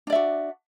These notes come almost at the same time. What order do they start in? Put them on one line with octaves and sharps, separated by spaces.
D4 D5 E5 F#4